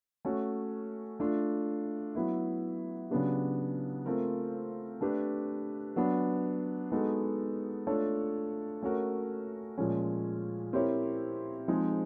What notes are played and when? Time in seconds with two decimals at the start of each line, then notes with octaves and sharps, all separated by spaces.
0.25 A3 C#4 F#4
1.20 A3 D4 F4
2.15 F#3 B3 E4
3.11 C#3 F#3 B3 D4 G4
4.06 A3 C4 F4 A#4
5.01 A3 D4 G4 B4
5.96 F#3 B3 D4
6.92 G#3 B3 D#4 F#4 A4
7.87 A3 D4 F4 A4 C#5
8.82 A3 C#4 F#4 A#4
9.78 A#2 F3 G#3 C#4
10.73 C4 E4 G4 A#4 C#5
11.68 F3 G#3 C4 D#4 G#4